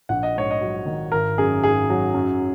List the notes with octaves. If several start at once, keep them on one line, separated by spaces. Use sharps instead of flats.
A#1 F#5
D#5
G#2 C#5
D#5
F#3
D#3
G#1 A#4
F#2 G#4
G#1 G#4
F#3
F#2